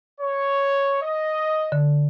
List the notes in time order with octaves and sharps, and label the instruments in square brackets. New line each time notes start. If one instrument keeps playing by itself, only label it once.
[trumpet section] C#5
D#5
[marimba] D3